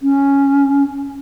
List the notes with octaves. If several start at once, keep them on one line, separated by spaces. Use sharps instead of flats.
C#4